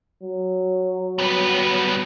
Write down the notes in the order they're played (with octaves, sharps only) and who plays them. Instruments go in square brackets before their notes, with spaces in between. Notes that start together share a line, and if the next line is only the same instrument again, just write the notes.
[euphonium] F#3
[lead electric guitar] G3 B3